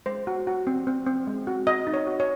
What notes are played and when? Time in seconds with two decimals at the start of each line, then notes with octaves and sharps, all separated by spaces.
0.06 G#3 C5
0.27 F#4
0.47 F#4
0.67 C4
0.87 C4
1.06 C4
1.27 G#3
1.47 F#4
1.67 F#4 D#5
1.87 D#4
1.94 C#5
2.07 F#4
2.20 C#5